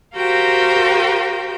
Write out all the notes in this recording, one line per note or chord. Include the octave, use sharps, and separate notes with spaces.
F#4 G4 A#4 C5 F5 G5